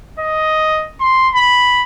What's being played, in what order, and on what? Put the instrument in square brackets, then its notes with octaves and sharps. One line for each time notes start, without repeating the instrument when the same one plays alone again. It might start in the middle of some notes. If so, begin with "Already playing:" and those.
[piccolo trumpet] D#5
C6
B5